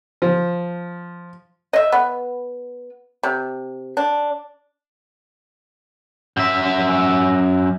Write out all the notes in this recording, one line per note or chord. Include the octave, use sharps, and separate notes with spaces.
F3
D#5 E5
B3
C3
D4
F#2 E5